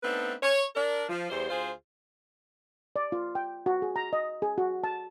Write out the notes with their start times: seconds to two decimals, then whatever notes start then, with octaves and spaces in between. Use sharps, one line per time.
0.03 A3 B3 C4 D4 D#4 B4
0.43 C#5
0.75 D4 A#4
1.09 F3
1.30 E2 G3 C5
1.49 D2 F4 G#4 C5
2.96 D5
3.12 F4
3.35 G5
3.66 F#4
3.82 G#4
3.96 A#5
4.13 D#5
4.42 G#4
4.58 F#4
4.84 A5